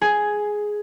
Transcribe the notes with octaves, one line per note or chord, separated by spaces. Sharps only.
G#4